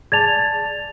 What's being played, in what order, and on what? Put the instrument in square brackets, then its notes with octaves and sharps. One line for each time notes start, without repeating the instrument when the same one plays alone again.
[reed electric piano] G#4 D5 A5 [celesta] G#6 A6 F7